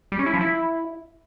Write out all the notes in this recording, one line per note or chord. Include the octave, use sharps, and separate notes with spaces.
G3
C#4
E4
F3
E4